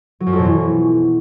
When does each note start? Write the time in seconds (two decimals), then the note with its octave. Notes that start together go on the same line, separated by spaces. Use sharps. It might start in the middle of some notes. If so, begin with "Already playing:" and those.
0.20 F#3
0.27 F#2
0.33 F2
0.39 B2
0.45 E3